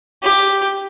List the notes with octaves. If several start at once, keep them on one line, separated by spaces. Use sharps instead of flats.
G4